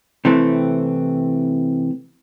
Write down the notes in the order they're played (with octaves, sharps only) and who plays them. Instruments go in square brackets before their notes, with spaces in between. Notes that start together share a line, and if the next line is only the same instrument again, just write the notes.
[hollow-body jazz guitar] C3 E3 A3 C4